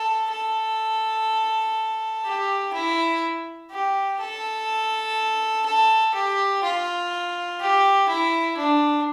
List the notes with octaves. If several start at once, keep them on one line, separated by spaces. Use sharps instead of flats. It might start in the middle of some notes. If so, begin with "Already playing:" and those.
Already playing: A4
A4
G4
E4
G4
A4
A4
G4
F4
G4
E4
D4